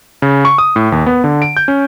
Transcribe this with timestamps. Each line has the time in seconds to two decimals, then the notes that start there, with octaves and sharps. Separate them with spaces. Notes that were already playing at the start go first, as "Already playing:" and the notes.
0.22 C#3
0.45 C#6
0.58 D#6
0.76 A2
0.92 D#2
1.06 B3
1.24 D3
1.42 D7
1.57 G6
1.68 C#4